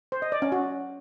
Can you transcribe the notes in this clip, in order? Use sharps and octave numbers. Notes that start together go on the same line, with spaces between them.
C5
D#5
D5
C#4
F#4